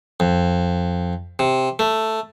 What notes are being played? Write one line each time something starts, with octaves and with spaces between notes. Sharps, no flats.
F2
C3
A3